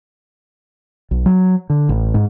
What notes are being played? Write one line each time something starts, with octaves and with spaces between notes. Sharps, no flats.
B1
F#3
D3
A1
G#2